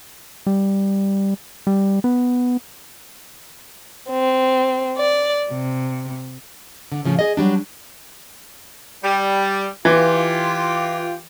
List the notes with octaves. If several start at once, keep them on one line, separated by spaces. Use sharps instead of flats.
G3
G3
B3
C4
D5
C3
D3
A2 C#3 F3
G#4 D#5
F#3 G3 D4
G3
E3 F4 G4